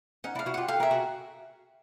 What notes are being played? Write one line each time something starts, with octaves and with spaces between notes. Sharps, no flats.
C#4 D#4 F#5
D4 E4 F5
E4 F#4
F4 G4 F#5
G4 A4 F5
G#4 A#4 E5
F#4 G#4